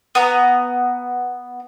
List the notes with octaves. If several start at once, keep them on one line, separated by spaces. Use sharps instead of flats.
B3 A#5